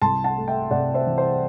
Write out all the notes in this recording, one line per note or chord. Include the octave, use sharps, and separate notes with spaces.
C2 A5 C6
F#5 A5
A3
E5 G5
C3 D5 F#5
C5 E5
E3
C5